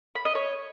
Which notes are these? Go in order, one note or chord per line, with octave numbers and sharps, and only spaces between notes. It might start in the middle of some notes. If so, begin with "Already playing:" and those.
B5
D#5
C#5